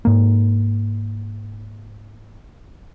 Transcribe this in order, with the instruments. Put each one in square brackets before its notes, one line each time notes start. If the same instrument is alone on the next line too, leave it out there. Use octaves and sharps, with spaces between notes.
[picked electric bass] G#2 A#3